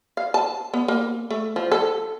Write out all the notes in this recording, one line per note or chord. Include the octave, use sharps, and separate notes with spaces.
F5
A5
B3
A#3
A3
F3
A4